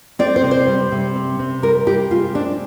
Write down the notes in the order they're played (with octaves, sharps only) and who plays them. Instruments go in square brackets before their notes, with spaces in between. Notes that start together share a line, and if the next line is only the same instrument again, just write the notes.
[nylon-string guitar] C4 D5
C5
C3
C5
G3
C3
C4
C3
G3 A#4
C3 G4
G#3 F4
C4 D4